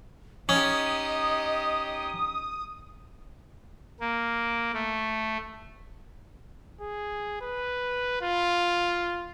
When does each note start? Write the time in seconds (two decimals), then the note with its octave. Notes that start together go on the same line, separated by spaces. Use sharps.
0.49 C#4 D#4 G4 D#5 D#6
4.00 A#3
4.73 A3
6.81 G#4
7.41 B4
8.22 F4